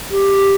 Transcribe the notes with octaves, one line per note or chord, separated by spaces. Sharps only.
G4